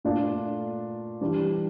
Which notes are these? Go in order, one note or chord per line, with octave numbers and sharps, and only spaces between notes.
A#2 A3 D4 F4
E3 G3 D4